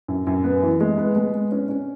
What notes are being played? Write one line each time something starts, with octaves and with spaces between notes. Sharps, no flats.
F#2
F#2
B3
E3
G#3
B3
G#3
B3
C#4
C#4